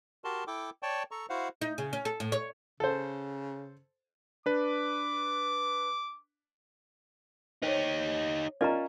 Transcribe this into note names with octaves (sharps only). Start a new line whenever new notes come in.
F#4 G4 A#4 A5 C6
E4 A4 G5 D6
C#5 D5 G5 A5 C#6
A4 A#5 C#6
E4 F#4 C5 F5 F#5
D#4
C#3
C#4
A4
A2
C#5
C#3 A4 C5
D4 B4 D6
D#4 G4 C5 C#5
C#4 F4 A#4 D5 D#5 A#5